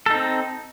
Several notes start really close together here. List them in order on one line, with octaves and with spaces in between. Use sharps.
A4 D#4 C4